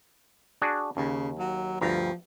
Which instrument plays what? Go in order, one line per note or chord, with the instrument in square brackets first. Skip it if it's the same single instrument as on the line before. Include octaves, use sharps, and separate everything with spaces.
[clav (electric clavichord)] D4 F#4 G#4
[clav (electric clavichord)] D#2 [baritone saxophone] C#3
[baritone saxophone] F#3
[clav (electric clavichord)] D2 G2 A#5 [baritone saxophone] F3